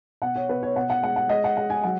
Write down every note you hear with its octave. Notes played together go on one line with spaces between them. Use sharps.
B2 F#5
C#5
B2 B4
C#5
B2 F#5
F#5
G#3 F#5
F#5
G#3 D#5
F#5
G#3 F#5
G#5
F#3 F#5